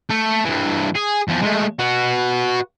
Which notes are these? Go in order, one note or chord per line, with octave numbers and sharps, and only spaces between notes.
A3
G2 E3
G#4
E2 F3
G#3 A3
F#4 B4